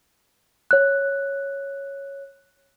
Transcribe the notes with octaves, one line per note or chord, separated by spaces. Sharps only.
C#5 F#6